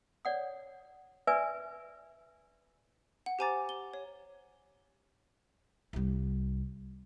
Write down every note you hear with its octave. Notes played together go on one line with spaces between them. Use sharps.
C#5 D5 F#5 D#6
B4 D5 E5 G#5 E6
F#5
G4 C5 G#5 A#5 D6 A6
G7
C#5
C2 G3